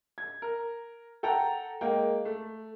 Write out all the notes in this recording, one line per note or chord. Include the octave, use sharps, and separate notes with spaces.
G#6
A#4
A4 F#5 G5 A#5
G#3 A#3 G5
A3